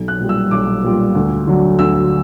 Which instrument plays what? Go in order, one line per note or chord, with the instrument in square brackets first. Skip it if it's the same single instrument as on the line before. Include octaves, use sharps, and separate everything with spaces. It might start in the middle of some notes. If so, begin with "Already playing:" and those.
Already playing: [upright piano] B1
F#6
A#2 G3
E6
B1 D6
A#2 G3
D2
D3 F#3
D2 E6